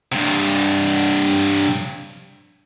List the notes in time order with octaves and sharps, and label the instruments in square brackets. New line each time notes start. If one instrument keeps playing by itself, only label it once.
[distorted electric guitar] G2 C3